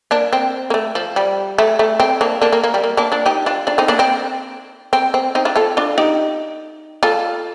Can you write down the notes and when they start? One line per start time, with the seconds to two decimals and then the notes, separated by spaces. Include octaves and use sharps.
0.11 A#3 D4
0.33 C4
0.70 A#3
0.74 A3
0.95 F3
1.16 G3
1.58 A3
1.79 A3
2.00 C4
2.21 A#3 D4
2.42 A#3 D4
2.52 A#3
2.64 A#3
2.74 G3
2.84 A#3
2.97 A#3 D4
3.12 D4 F4
3.26 D#4 G4
3.46 D4 F4
3.67 D4 F4
3.78 C4 D#4
3.88 A#3 D4
3.99 C4
4.93 C4
5.14 C4
5.35 C4 D#4
5.45 D4 F4
5.56 F4 A4
5.77 D4 F4
5.98 D#4 G4
7.03 F4 A4